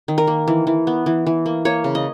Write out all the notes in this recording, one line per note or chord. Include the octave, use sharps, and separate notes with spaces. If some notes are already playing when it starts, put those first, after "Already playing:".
D#3
A#4
A#3
E3
E3
B3
E3
E3
A#3
A#3 C#5
C#3
D#5